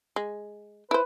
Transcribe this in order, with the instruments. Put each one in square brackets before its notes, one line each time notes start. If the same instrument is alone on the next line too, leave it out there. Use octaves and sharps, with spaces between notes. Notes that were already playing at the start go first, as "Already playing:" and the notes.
[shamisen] G#3
[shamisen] E4 C5 [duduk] B4